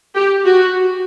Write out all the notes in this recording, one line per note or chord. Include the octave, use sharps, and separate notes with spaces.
G4
F#4